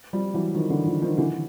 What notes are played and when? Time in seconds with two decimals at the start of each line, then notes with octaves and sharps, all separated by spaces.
0.13 F3 G3
0.34 E3 F#3
0.55 D#3 F3
0.70 D3 E3
0.86 D#3 F3
1.02 D#3 F3
1.18 D3 E3